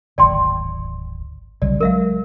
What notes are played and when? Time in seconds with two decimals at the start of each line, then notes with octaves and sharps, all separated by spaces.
0.18 D1 G#1 D5 G5 C6
1.62 B1 C#3 G3 D5
1.80 F#3 G#3 A#4 E5 F5